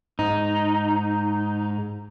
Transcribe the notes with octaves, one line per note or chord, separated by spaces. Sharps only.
G#2 D#4